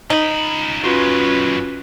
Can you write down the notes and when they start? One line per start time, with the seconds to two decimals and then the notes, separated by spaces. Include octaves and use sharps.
0.10 C#2 D#4 B5
0.84 F#2 G#3 C#4 F4 F#4 B4